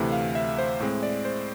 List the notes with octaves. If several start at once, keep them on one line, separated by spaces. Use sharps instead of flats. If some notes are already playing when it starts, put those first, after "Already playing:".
Already playing: D2 C3 E3 A3 E4
F5
E5
C5
A2 G#3 C4
D5
C5